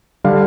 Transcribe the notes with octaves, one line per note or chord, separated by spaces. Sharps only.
D3 G3 F5